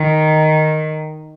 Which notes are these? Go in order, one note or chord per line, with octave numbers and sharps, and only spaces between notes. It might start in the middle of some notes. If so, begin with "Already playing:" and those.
Already playing: D#3